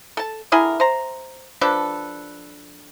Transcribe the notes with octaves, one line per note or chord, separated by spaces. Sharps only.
A4 A5
D3 E4 G#4 A#4
C5 A#5
F3 D4 A4 B4